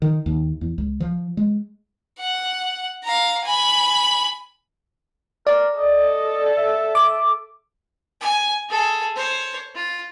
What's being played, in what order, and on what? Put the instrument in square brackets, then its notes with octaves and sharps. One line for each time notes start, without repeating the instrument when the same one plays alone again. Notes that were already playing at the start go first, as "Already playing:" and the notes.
[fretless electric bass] D#3
D#2
E2
C#2
F3
G#3
[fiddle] F#5
F5 A#5
G#5 B5
[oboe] A#4 [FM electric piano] D5
[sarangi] A4 [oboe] D#5
[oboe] E5
[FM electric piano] D6
[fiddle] G#5
G#4 A4
C5 C#5
F4